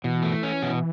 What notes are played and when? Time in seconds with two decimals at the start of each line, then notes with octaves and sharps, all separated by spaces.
0.04 B2 E3
0.23 A3
0.43 C#4
0.62 B2